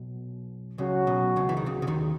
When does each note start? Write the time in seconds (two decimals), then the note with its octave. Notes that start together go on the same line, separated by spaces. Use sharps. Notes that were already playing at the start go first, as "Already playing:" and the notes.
Already playing: B1 B2
0.78 C#2 C#3 F#3 C#4 F#4
1.07 B1 B2
1.36 C#2 C#3
1.49 E3
1.57 D#3
1.66 C#2 C#3
1.82 C#3
1.87 D#2 D#3